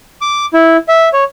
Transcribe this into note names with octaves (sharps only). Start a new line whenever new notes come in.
D6
E4
E5
C#5